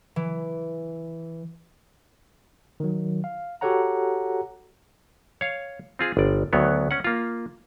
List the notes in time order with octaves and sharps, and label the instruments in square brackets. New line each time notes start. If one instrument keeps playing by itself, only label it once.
[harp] E3
[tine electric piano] D#3 F#3
F5
F#4 G4 A4 C#5 F#5 A#5
[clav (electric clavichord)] C#5 F5
C4 F4 G#4
G1 D5
D2 D#3 F#3 B3 C#5
C#4 F#5
A#3 F4